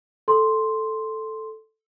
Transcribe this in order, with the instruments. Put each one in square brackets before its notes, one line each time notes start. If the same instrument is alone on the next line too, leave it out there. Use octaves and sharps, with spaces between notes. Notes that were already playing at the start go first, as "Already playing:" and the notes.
[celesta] A4 C6